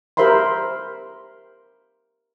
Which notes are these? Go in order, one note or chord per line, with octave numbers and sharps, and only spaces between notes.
G4 A#4 C5 E5 B5 C6